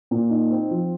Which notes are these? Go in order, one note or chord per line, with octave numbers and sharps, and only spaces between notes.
A#2
D#4
C4
F3